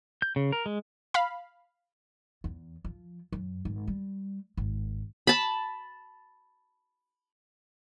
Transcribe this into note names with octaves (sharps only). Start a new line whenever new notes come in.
G6
C#3
A#4
G#3
F5 B5
E2
F3
F#2
G#1
G3
G#1
A5 B5